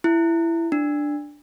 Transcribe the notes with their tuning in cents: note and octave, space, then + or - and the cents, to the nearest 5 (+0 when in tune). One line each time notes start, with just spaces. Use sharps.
E4 +15
D4 +5